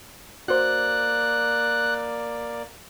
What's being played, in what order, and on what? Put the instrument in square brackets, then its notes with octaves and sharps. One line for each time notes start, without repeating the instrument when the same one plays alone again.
[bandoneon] A#3 D5 [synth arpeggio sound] F#4 C5 [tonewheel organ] F#6